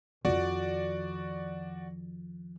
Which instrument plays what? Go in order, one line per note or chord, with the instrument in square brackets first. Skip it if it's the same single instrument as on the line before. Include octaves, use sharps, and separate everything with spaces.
[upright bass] F2 D#3 [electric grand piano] F#4 D5